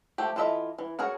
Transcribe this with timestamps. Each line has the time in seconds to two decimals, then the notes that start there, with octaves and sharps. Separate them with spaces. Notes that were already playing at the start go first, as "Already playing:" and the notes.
0.18 F3 A3 G4
0.36 E3 F4 A4 D#5 E5
0.78 E3
0.99 F#4 G#4 A#4 C#5